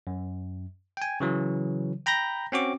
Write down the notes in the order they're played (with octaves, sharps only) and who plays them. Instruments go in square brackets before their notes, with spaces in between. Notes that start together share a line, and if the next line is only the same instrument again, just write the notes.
[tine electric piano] F#2
G5 G#5
C#3 E3 F#3
G5 A#5 B5 G6 A#6
C4 C#4 F#4 D6